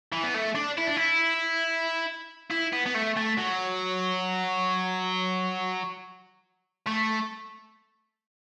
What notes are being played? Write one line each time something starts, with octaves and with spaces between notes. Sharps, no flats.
E3
B3
A3
D4
E4
D4
E4
E4
B3
B3
A3
A3
F#3
A3